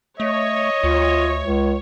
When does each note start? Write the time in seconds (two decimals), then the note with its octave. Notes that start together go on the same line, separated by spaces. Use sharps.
0.20 A3 C#5 D#5
0.84 D2 F4
1.38 C#2